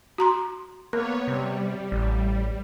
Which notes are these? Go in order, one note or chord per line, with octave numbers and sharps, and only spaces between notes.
F#4 A#5 C6
A#3 B3 A#4 C#5
C3 G3
A1 G3